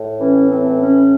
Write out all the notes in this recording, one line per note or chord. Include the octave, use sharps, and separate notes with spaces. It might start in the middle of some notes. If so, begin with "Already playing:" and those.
Already playing: A2
E3 C#4
C4
A2
C#4